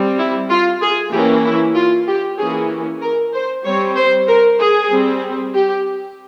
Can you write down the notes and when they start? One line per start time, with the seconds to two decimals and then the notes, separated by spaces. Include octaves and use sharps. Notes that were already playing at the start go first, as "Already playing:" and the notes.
Already playing: G3 C4
0.18 E4
0.50 F4
0.82 G#4
1.12 E3 A#3 C#4 G4
1.45 E4
1.75 F4
2.07 G4
2.38 E3 A#3 C#4 G#4
3.01 A#4
3.34 C5
3.65 G3 C4 C#5
3.96 C5
4.27 A#4
4.60 G#4
4.90 G3 C4
5.53 G4